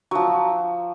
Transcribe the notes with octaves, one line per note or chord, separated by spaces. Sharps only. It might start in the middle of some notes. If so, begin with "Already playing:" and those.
F3 F#3